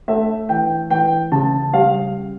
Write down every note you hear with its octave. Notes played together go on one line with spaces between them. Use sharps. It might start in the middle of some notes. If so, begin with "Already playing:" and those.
A3 E5
E3 G5
E3 G5
C#3 A5
G3 F5